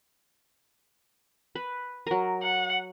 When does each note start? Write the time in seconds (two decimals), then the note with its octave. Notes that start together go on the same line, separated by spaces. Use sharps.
1.55 B4
2.07 F#3 A#4
2.43 F#5